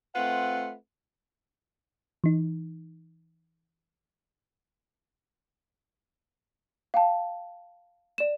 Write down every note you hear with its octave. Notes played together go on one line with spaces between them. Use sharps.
A3 C4 F4 B4 F#5
E3 D#4
F5 G5 A5
D5 E7